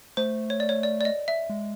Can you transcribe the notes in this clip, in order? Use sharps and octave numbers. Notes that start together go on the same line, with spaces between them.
A3 C5
C#5
D5
C#5
D5
D5
D#5
E5
G#3